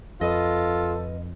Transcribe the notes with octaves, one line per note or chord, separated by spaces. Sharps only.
F2 F4 A4 B4 D#5